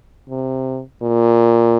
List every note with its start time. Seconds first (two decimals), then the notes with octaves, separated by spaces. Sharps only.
0.30 C3
1.02 A#2